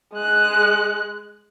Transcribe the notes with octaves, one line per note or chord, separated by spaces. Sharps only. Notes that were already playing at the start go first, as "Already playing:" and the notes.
G#3 F#6